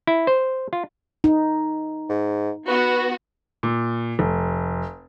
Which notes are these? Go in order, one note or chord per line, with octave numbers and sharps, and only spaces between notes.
E4
C5
F4
D#4
G#2
B3 F#4 B4
A#2
F1